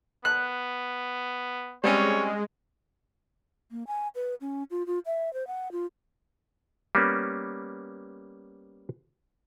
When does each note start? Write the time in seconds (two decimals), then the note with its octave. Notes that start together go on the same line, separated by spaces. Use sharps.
0.25 B3 F#6
1.84 G3 G#3 C4 C#4 C#5
3.71 A#3
3.87 G#5
4.15 B4
4.41 C#4
4.71 F4
4.86 F4
5.06 E5
5.33 C5
5.47 F#5
5.72 F4
6.95 G3 A#3 B3 C#4